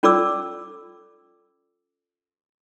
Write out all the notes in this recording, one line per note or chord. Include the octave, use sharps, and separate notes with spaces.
C#4 F4 A4 D5 D6 E6